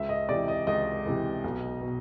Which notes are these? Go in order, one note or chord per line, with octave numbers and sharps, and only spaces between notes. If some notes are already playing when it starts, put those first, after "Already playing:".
Already playing: C#2 E5
D#5
C3 E3 D5
D#5
C#2 D#5
C3 E3
B1
B2